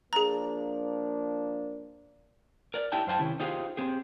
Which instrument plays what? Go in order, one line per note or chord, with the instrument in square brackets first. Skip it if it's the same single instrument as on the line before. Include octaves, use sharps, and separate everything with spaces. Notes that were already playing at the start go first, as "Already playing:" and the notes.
[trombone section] F3 A#3 D4 [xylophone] G#4 A#5
[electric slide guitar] A#4 D5
D#4 E4 G4 G5 A5
F#2 C5 F5 G5 A5
C3 D#3 C#4 E4 G4
D#4 F4 G4 G#4 C5 F5
C4 G4 G#4